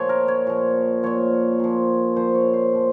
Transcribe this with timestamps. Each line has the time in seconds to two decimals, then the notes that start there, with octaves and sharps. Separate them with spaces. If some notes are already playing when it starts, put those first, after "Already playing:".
Already playing: A#2 F3 C#5
0.09 A#4
0.28 C#5
0.47 A#2 F3
1.03 A#2 F3 C#5
1.60 A#2 F3
2.16 A#2 F3 C5
2.35 C#5
2.54 C5
2.73 A#2 F3